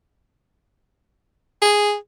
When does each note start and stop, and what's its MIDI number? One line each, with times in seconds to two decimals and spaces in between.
1.62 1.95 68